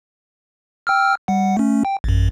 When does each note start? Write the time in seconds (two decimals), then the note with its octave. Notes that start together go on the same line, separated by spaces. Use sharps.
0.87 G5 E6 F6
1.28 G3 F#5
1.57 A3 C#4
1.85 G5
2.04 A1 F#2